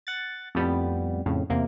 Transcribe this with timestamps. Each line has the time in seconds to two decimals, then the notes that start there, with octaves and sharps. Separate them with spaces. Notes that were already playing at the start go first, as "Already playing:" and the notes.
0.07 F#5 A6
0.55 F2 A2 G3 B3
1.26 F2 A2 C#3
1.49 E2 C3 A#3